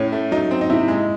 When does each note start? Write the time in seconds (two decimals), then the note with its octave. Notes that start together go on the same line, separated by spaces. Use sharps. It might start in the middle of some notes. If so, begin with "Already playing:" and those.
Already playing: A2 C#4
0.12 A3
0.31 F#3 D#4
0.51 C4
0.61 D#4
0.69 C3 E4
0.88 G#3